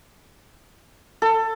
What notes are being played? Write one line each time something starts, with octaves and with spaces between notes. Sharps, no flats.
A4